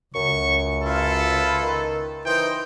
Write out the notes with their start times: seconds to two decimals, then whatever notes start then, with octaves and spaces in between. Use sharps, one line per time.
0.15 C#2 F#2 C#6
0.83 E4 F4 A4 B4
1.63 D#3
2.26 E3 D#4 C5 G5